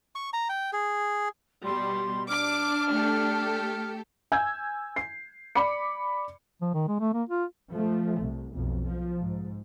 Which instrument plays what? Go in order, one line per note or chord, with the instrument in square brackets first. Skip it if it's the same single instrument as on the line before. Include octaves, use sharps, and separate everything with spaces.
[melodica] C#6
A#5
G5
G#4
[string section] B2 G3 [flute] C6
[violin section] D4 [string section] D6 [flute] F6
[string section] A3 G4 A4
[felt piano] G#5 E6 G6 G#6
C7
D5 B5 D6 C#7
[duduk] F3
D#3
G#3
A3
A#3
F4
[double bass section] F3 A3
C2
B1 F2
F3
G#2